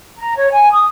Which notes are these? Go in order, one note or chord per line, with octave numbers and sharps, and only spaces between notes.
A#5
C#5
G#5
D#6